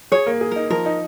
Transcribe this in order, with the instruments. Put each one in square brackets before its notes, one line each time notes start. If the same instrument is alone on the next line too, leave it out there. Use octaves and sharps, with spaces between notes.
[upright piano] G#4 [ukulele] C#5
[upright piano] A#3
G#4
[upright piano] D#4 [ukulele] A#4
[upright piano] F3 [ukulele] A#4
[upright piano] D#4